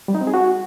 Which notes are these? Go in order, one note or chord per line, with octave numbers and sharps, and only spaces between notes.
G3
D#4
C4
G#4
F#4